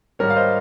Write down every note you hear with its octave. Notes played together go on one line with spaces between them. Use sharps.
G#2 D#3 G3 A#4 C#5
F5
C5 D#5